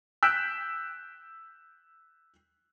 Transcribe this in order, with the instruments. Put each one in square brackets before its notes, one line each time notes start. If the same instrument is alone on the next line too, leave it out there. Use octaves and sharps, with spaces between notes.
[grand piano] E6 F#6 G6 B6 D7 E7